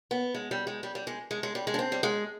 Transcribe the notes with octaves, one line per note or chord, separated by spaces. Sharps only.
B3
G#3
G3
G#3
G3
G3
G#3
G#3
G#3
G3
G#3
D4
C4
G3
G#3